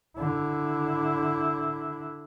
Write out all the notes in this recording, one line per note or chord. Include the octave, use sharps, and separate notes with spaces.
D3 E4